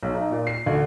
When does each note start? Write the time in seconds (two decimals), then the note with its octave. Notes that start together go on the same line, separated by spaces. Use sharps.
0.03 B1
0.14 D#4
0.31 A#2
0.47 C7
0.66 D2